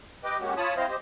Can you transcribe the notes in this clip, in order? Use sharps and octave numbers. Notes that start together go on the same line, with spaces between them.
G4 B4 D#5 G5 D6
G#3 A#3 C#4 F#4 G4
F4 C#5 A5 B5 D#6
C4 E4 C5 D#5 F5
G4 C5 D#5